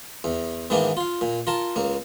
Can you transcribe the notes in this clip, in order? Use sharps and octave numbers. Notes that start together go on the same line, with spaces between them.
E2
G#2 D#3 E3 A#3 B3 D4
F4 F5
A#2
F4 A#4 A5
C#2 A#3